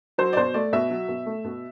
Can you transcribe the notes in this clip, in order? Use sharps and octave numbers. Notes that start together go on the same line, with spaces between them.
F#3 C5
D5
B2 C5
A3 D5
B2 E5
F#3
B2
A3
B2